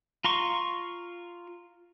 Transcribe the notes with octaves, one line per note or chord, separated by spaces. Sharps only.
F4 A#5 C6 C#6